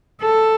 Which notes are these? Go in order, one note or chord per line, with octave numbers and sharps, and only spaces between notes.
A4